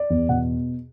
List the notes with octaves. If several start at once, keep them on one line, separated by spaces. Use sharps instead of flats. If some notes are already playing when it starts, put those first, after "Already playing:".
Already playing: D5
E2
B2 F#5